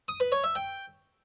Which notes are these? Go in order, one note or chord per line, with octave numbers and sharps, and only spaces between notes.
D#6
B4
C#5
E5
G5